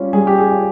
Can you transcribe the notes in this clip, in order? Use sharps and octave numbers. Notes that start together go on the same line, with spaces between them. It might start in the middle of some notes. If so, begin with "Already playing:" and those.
Already playing: G3 C#4 F4
G3 G#4
G4
G#4
C#4 F4